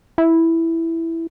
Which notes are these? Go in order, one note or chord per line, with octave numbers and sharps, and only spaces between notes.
E4